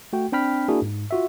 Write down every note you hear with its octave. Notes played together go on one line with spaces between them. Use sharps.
A3 F#4 G5
C4 D4 G5 B5 F6 B6
A#3 D4 E4 F#4 G#4 A#4
G#2
F4 F#4 E5